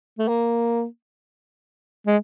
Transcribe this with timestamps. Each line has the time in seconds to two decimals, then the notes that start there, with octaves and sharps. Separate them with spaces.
0.19 A3
0.28 A#3
2.07 G#3